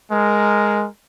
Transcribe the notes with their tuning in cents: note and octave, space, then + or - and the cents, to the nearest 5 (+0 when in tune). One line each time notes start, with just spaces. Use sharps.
G#3 +0 A#4 +0